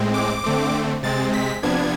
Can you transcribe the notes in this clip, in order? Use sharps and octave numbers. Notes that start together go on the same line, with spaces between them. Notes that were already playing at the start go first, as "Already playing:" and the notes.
Already playing: A2 G#3 C4
D6
D3 A3 C4
C3 G#3 C4 A6
B6
C3 F3 B3 D4 G#6